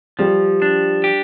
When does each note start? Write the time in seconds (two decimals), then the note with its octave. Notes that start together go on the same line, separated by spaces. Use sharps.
0.19 F3 G3
0.62 D4
1.04 G4